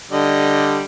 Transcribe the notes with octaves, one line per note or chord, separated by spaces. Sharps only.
D3 G3 D#5